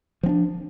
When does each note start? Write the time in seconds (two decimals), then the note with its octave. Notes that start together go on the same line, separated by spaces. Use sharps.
0.23 F3
0.26 C4
0.29 D4